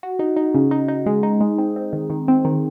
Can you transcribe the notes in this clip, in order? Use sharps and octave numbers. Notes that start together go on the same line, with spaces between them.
F#4
D#4
D#4
C#3
D#4
D#4
G#3
D#4
G#3
C4
C4
D#3
D#3
C4
D#3